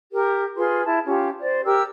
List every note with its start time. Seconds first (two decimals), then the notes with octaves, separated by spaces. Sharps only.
0.12 G4 A#4
0.56 F4 G#4 B4 C6
0.85 E4 A5
1.05 C#4 F4 G4
1.40 C5 D5
1.64 G4 A#4 E6